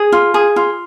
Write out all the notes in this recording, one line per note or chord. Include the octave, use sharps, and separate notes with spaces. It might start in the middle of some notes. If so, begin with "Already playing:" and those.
Already playing: G#4
F4
G#4
F4